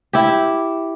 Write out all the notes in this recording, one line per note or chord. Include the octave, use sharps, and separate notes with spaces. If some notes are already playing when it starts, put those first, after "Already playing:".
E4 G4